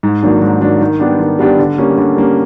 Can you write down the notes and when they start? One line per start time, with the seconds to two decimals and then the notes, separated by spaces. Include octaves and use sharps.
0.03 G#2
0.23 D#3 F#3 A#3 D4
0.42 G#2
0.61 D#3 F#3 A#3 D4
0.81 D#3
1.00 G3 B3 D4 G4
1.19 D#3
1.39 G3 B3 D4 G4
1.59 D3
1.78 G3 A#3 C#4
1.98 D3
2.16 G3 A#3 C#4